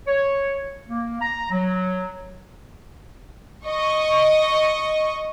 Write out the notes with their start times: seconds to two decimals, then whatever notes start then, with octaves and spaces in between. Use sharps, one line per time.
0.07 C#5
0.89 A#3
1.21 A#5
1.51 F#3
3.66 D#5 C#6